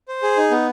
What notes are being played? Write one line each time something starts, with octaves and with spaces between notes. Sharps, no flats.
C5
G#4
D#4
B3